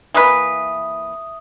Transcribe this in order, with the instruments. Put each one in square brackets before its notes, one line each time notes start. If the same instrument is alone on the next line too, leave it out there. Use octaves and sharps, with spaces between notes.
[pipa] E3 A#3 B4 [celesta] E5 D#6